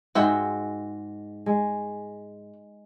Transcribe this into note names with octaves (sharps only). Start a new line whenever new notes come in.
G#2 G#3 F#4 E5 G5
G#3